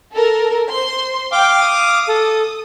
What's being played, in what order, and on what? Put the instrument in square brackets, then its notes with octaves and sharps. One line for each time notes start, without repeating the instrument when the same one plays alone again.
[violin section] A4 A#4
C5 C6
[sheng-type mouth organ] F5 D6 [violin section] G5
[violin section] D#6
[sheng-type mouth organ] A4